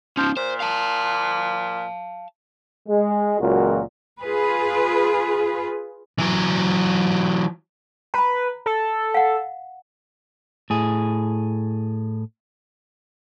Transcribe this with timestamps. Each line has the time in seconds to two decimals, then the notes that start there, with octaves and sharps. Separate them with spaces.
0.17 F3 C#4 D#4
0.37 A#2 C5
0.60 F5 A5
2.89 G#3
3.40 C#2 A#2 F#3 F#4 A#4
4.22 F4 G#4 B4
6.19 E3 F#3
8.14 B4 A#5 B5
8.66 A4
9.14 F5 F#5
10.70 A2 G#4